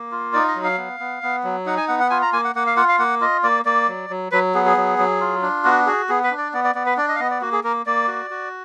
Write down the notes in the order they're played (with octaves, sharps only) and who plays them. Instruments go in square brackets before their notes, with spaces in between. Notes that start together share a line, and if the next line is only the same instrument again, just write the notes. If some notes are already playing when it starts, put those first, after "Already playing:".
Already playing: [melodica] A#3
F4
D#4 D5
D#5
F#3
F5
B3
B3
B3
F#3
D#4 F#5
G#5
B3 F#5
F#5
F4 G#5
A#5
A#3 G#5
F#5
A#3 F#5
F5
F4 F#5
F5
A#3 F#5
F4 D#5
A#3 D5
A#3 D5
F#3
F#3
F#3 B4
B3 G#4
G#4
F#3
F#3
F4
D4
B3 F#4
F#4 G#4
B3 G#4
B4
D4
D5
B3 D5
D5
B3 D5
B4
D4 D5
D#5
F5
B3 D#5
D5
A#3 F#4
G#4
A#3 A#4
A#3 D5
F#4
F#4